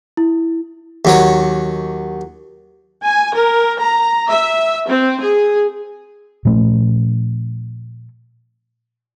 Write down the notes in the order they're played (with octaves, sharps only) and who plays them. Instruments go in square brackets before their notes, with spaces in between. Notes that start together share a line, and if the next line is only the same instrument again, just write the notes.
[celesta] E4
[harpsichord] D#2 F#3 C#5
[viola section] G#5
A#4
A#5
E5
C4
G#4
[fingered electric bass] A#2 F3 A3 C#4